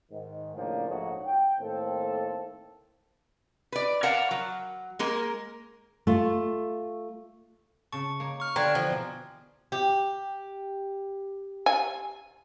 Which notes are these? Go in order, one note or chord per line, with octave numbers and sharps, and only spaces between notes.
G#2 D#3
A2 C#3 F3 A#3 D4 F4
A#1 G#2 A3 D#4 F#4 C#5
G5
A2 D#3 A#3 C4 A4
B4 D5
A#4 C#5 F5 F#5 A5
F#3
G#3 A#3 A#4
A3 F4
C#3 A5 C#6
A#3 D#4 C#5
C#6 F6
D3 B3 D4 F4 G5 A#5 C6 G#6
E3 F3
B2 G#4 D5
G4
G#5